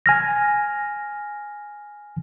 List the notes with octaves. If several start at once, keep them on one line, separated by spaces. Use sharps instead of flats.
G#5 F6 A#6